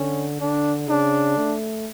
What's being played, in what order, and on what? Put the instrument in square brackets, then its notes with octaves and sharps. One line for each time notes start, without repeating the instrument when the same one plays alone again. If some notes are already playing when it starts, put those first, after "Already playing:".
Already playing: [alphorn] D3 [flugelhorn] C#4
[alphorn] D3 [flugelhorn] D4
[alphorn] C#3 [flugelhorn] D4
[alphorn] A3